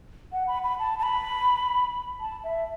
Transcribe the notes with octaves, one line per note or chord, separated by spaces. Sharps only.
F#5
B5
B5
A5
A5
B5
A5
E5